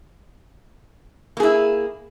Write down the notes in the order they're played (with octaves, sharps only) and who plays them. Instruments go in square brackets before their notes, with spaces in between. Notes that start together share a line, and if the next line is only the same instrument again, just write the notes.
[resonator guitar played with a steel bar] A#3
G#4
E4